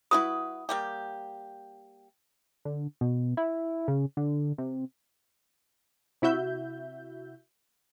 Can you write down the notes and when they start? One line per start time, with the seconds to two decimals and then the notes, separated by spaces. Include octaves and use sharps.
0.11 E4 F#4 B4 D#6
0.69 G3 A#3 G4
2.65 D3
3.01 B2
3.37 E4
3.88 C#3
4.17 D3
4.58 C3
6.22 C3 E4 F#4 E5 G6